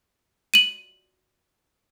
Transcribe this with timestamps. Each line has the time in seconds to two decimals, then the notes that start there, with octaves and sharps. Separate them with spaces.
0.54 D#7 F#7